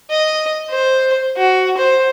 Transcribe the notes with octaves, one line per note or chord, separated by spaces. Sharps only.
D#5
C5
F#4
C5